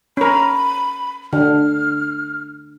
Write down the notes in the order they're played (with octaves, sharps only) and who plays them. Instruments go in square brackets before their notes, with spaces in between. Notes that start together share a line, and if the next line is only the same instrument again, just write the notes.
[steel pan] C#4 A#4 [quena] B5
[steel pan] D3 [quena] F6